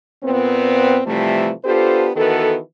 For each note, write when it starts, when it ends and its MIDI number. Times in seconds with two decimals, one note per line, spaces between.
0.23 1.01 46
0.23 1.01 59
0.23 1.01 60
1.06 1.52 48
1.06 1.52 52
1.06 1.52 53
1.06 1.52 55
1.06 1.52 57
1.65 2.11 59
1.65 2.11 62
1.65 2.11 65
1.65 2.11 67
1.65 2.11 69
1.65 2.11 72
2.16 2.58 51
2.16 2.58 52
2.16 2.58 59
2.16 2.58 66
2.16 2.58 69